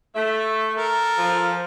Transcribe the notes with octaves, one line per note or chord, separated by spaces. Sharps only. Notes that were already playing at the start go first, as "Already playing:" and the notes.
A3 E5
A4 A#4
F3